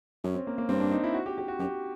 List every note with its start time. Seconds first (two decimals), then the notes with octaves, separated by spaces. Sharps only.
0.24 F#2 C#4
0.35 C4
0.47 A#3
0.58 A#3
0.69 G2 C4
0.80 D4
0.91 D#4
1.04 E4
1.14 F#4
1.26 G4
1.38 G4
1.48 F#4
1.59 F#2 G4